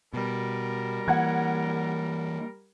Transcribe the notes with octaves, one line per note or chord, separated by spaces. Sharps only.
B2 G3 A#4
E3 A#3 F#5 G#6